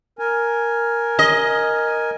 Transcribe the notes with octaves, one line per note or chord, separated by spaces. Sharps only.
A#4 G#5
D#5